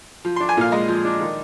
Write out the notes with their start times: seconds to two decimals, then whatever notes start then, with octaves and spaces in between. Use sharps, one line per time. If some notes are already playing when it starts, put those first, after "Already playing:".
0.25 F3
0.36 C6
0.40 D4
0.49 G#5
0.57 A#2 F5
0.72 G#3 D#5
0.88 F3
1.05 D4
1.21 D#3